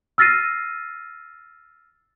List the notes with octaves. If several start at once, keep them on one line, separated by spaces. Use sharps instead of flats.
E6 F6 A6 A#6 C7 D#7